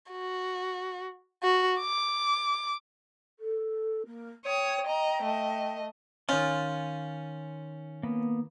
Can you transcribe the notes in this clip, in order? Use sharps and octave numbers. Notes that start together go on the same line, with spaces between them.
F#4
F#4
D6
A4
A#3
C#5 G5 D#6
D#5 A#5
A3 D#5
D#3 C#4 F4 G#5 C6 G6 A6
A#3 B3